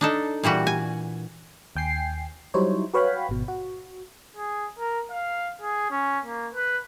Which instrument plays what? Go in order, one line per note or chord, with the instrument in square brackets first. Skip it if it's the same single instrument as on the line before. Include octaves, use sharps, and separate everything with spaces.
[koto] D4 D#4 A4
A#2 E3 G3 F#4
G#5
[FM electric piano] D#2 G5 G#5 C7
F#3 G3 D#4 E4 C5 C#5
F#4 B4 C#5 F5 G5 B5
G#1 B2
F#4
[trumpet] G#4
A#4
F5
G#4
C#4
A#3
B4